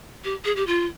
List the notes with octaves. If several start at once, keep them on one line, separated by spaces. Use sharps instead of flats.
G4
G#4
G4
F4